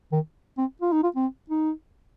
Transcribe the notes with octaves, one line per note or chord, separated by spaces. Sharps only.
D#3
C4
F4
D#4
F4
C4
D#4